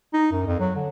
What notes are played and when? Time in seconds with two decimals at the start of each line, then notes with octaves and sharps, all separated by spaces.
0.13 D#4
0.32 F#2
0.47 F2
0.60 F#3
0.76 D3